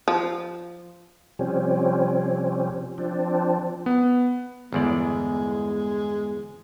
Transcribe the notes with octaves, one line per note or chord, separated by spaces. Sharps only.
F3
C3 F3 G3 C4 C#4
F3 C4 D4
B3
G1 E2 G#3 D5